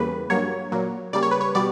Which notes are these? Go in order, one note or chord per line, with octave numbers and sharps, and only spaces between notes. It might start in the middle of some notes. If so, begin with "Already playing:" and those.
Already playing: E2 C#3 G3 A#3 B4
G2 F#3 A#3 C#5
A#2 F#3 A#3
C#3 G3 A#3 D5
C#5
B4
C#5
B2 G3 B3 D5